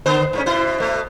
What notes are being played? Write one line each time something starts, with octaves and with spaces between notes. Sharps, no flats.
D3 B3 C5
G#2 A3 C#4
B2 E4 C5
B2 A3